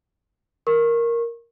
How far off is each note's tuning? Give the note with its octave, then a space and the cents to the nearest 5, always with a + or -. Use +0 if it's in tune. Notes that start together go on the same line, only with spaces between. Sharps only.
A#4 +0 C#6 -30